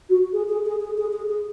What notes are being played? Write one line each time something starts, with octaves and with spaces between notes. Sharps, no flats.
F#4
G#4
G#4
G#4
G#4
G#4
G#4
G#4